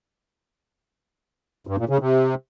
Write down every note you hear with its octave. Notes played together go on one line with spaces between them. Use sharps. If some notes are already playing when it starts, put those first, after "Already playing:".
G2
A#2
C#3
C3